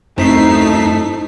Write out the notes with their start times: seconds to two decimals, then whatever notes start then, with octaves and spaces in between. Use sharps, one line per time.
0.18 F#2 A3 C4 D#4 E4 A4 B6 C7